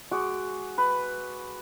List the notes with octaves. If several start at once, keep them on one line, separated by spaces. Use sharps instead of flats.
G#3 F#4 D6
B4